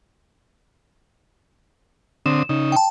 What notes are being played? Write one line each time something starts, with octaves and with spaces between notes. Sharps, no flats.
D3 C4 D#6 E7
C#3 D#4
G5 A5